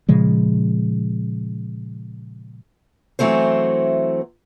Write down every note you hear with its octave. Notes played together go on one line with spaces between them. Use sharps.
A#2 C#3 F3 G#3
E3 F#3 A3 C4 C5